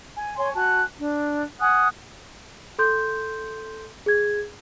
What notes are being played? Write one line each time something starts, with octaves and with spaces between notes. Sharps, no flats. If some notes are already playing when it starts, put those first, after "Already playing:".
G#5
C#5 G#5 C6 C#6
F#4 G#5 A5 F#6
D4
F#5 G#5 D#6 F#6
A4 C6 G6
G#4 G#6